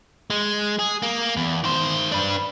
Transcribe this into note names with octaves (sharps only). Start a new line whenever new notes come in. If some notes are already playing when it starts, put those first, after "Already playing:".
G#3
G#4
A#3
E2
D#3 C5
D4 B4